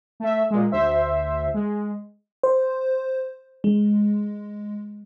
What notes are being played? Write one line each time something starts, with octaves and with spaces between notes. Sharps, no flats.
A3 E5
A#2 G#3
D2 C5 E5
G#3
C5
G#3